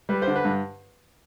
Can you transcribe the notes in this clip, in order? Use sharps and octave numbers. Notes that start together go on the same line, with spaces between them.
G3 B4
C5
D3
B4
G2